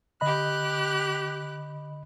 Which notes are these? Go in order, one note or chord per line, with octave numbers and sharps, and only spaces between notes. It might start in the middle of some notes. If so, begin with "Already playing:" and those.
D3 G4 D#5 B5 F#6